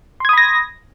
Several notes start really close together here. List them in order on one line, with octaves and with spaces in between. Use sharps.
C6 G#6 D#6 B5 A#6